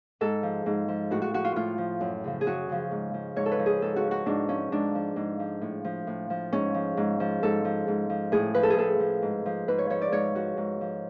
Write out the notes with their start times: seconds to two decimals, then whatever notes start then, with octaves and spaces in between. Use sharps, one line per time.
0.21 G#2 A4
0.43 F3
0.66 G#2
0.88 F3
1.11 A2 F#4
1.22 F#4
1.34 F3 F#4
1.45 F4
1.56 A2 F4
1.78 F3
2.01 F#2
2.24 C#3 F3
2.41 G#4
2.46 F#2 F#4
2.69 C#3 F3
2.91 G#2
3.14 F3
3.36 G#2 C#5
3.46 A4
3.52 B4
3.59 F3
3.66 G#4
3.82 G#2 A4
3.96 F#4
4.04 F3
4.11 F#4
4.26 G#2 D4
4.48 F3 C#4
4.72 G#2 D4
4.95 F3
5.16 G#2
5.40 F3
5.61 A2
5.85 F3
6.07 A2
6.30 F3
6.52 G#2 C#4
6.75 F3
6.97 G#2
7.20 F3
7.43 G#2 A4
7.65 F3
7.88 G#2
8.10 F3
8.32 A2 G#4
8.55 F3 B4
8.63 A4
8.70 G#4
8.77 A2 A4
8.99 F3
9.22 G#2
9.46 F3
9.68 G#2 B4
9.78 C#5
9.90 F3 C#5
10.02 D5
10.12 G#2 C#5
10.35 F3 F#4
10.57 G#2
10.81 F3